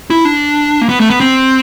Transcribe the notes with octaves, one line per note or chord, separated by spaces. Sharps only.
E4
D4
A#3
B3
A3
B3
C4